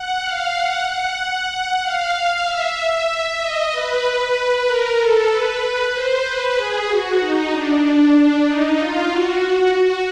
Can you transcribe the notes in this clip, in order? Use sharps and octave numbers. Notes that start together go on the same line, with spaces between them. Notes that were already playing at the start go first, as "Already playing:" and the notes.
Already playing: F#5
F5
F#5
F#5
F#5
F5
F5
E5
D#5
B4
A#4
A4
B4
C5
B4
G#4
F#4
D#4
D4
D4
D#4
F4
F#4